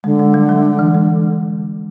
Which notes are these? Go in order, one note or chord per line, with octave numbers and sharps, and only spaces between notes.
D3 G#3
G#3
G3
F#3
E3
G#3